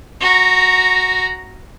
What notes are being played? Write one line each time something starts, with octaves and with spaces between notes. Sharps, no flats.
F#4 A#5